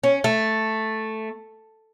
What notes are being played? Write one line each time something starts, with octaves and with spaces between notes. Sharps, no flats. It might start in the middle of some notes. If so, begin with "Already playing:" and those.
C#4
A3